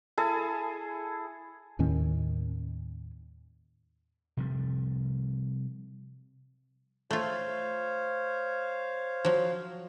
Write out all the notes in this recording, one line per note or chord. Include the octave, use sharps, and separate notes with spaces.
E4 G#4 A4
D#2 A2 D#3 C#4
C3 F3 G3
A3 F4 C5 C#5 F5
F3 F#3